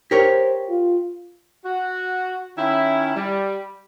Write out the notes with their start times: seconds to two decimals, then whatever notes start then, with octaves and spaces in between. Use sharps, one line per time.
0.11 G4 A#4 C5 C#5
0.69 F4
1.64 F#4
2.57 D#3 C#4 E4
3.15 G3